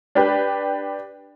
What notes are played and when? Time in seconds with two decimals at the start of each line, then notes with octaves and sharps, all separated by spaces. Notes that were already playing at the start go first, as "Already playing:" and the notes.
0.15 D4 G4 B4